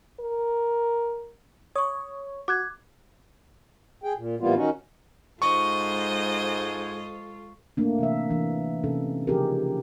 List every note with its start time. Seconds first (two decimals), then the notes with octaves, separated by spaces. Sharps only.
0.20 A#4
1.76 C#5 C#6 D#6
2.48 F#4 D6 F#6 G#6
4.04 G#4 G5
4.17 A#2
4.40 A2 E3 G3 A#3 B3 F4
4.55 D#3 C#4 D#4 F#4
5.42 G#2 G#3 F4 A4 C5 D#5 C#6
7.77 A3 A#3 D4
7.99 C3 E3 E5
8.30 E3 D4
8.84 C3 C#4 D#4 A4
9.27 C#3 F3 D#4 G4 G#4 A#4